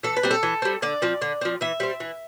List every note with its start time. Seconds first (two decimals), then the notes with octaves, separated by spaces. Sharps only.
0.03 E3 A4
0.16 B4
0.23 G3 C4
0.31 A4
0.43 E3
0.62 G3 C4
0.82 D3 D5
1.02 F3 C4
1.21 D3
1.41 F3 C4
1.61 E3 E5
1.80 G3 C4
2.00 E3